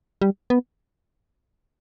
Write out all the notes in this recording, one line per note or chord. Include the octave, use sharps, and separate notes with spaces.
G3
B3